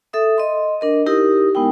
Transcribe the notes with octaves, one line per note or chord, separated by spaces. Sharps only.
A4 E5 D#6
D#5 C6
D4 A#4 D#5
D#4 E4 G4 A#4 D#6
G#3 B3 D#4 E4 G5